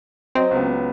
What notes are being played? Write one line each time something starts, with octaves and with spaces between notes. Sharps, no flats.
F#3 C4 D#5
C#2 F#3 B3